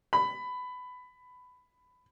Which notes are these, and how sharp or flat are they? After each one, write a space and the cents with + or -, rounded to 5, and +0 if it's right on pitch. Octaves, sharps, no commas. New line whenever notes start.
B5 +15